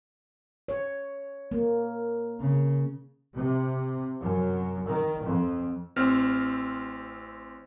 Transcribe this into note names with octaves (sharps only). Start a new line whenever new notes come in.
C#5
A#3
C#3
C3
F#2
D#3
F2
A1 C4 F6